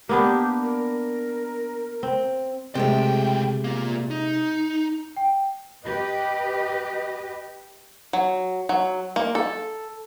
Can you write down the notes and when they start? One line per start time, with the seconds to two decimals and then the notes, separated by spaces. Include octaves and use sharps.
0.09 A#3 B3 D4 G4
0.63 A#4
2.03 C4
2.75 C#2 C3 G#3 A3 G5
3.64 A#2 A#3
4.11 D#4
5.16 G5
5.85 G4 B4 D#5
8.13 F#3
8.69 F#3
9.16 A#3
9.35 A4